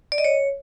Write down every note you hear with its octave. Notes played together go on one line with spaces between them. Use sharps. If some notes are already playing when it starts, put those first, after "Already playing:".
D5
D#5
C#5